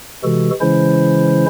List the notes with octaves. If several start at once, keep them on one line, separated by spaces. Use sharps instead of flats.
C3 E3 G#3 F#4 A4
C#3 E3 G#3 C#4 E4 C5